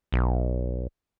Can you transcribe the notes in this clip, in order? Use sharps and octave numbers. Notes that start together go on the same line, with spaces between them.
B1